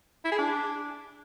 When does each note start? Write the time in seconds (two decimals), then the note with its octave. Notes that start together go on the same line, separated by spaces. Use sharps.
0.25 E4
0.32 G#4
0.39 D4